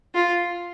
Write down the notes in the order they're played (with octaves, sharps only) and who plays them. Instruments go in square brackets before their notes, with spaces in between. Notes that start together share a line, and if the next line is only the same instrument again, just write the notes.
[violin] F4